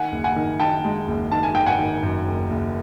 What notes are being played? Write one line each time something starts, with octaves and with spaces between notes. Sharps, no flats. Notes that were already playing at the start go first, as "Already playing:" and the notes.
Already playing: D#3 F#5 G#5
F#1
F#5 G#5
D#3
D#3 G5 A5
G#3
F#1
D#3 A5
G#5
D#3 G5
F#5 G#5
D#3
F#2
F#1
F#1